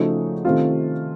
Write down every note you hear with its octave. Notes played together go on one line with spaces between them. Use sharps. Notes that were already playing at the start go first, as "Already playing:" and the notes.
Already playing: C#3 F3 A3 D#4 F#4
C3 D#3 A3 C4 F4